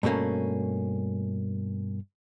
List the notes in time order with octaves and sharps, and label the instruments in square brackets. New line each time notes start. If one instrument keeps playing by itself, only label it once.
[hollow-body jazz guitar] G2 B2 A3 A#3 C#4